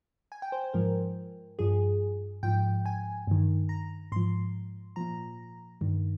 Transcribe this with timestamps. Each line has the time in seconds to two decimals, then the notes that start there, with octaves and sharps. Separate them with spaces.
0.32 G#5
0.42 G5
0.52 C5
0.64 C5
0.74 G#2 F3 A#4
1.59 G2 F3 G#4
2.43 G#2 F3 G5
2.86 G#5
3.27 G2 D#3
3.69 A#5
4.12 G#2 F3 C6
4.96 A#2 F3 A#5
5.81 G2 D#3